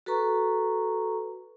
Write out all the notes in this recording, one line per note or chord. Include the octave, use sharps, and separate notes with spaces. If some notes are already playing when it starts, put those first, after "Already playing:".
F#4 A4 B4 A#5 C#6